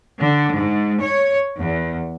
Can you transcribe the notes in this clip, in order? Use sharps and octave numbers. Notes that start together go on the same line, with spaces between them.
D3
G#2
C#5
E2